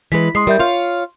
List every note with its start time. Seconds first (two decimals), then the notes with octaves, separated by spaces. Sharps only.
0.12 E3 G#3 B4 B6
0.35 G#3 C6 D#6 C7
0.47 G3 A#4 E5 G6
0.59 F4 C#5 F5 C6